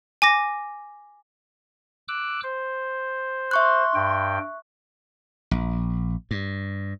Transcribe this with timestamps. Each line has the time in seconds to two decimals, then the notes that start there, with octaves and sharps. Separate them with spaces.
0.22 G#5 D6 A#6
2.08 D6 E6 F#6
2.43 C5
3.51 E5 C6 C#6 F#6
3.95 G2 G5
5.51 A#1
6.31 G2